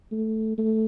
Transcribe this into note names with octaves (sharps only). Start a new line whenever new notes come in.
A3
A3